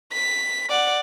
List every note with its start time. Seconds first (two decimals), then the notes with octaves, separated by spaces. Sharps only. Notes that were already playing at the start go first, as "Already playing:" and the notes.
0.13 B6
0.70 D5 F#5